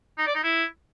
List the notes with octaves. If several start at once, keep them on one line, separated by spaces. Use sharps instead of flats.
D#4
D5
D#4
E4